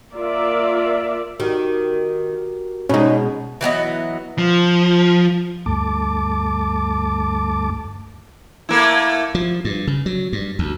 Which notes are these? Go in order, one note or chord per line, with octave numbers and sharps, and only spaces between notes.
A#3 F4 A#4 D5 E5
D#3 F#4 G4 A#4
B2 G#3 C#4 D#4
E3 F#3 B3 D#5
F3
D2 G2 A3 A5 D6
A3 A#3 E4
F3
G2
C#3
F#3
G2
D2